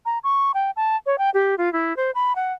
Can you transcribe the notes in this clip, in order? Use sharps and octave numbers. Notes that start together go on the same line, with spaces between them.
A#5
C#6
G5
A5
C#5
G5
G4
F4
E4
C5
B5
F#5